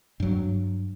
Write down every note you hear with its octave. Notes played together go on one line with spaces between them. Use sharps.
G2 F#3